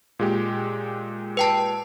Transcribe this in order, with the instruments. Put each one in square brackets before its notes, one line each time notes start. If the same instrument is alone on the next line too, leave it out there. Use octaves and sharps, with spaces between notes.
[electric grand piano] A#2 G#3 G4
[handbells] B4 G5 A5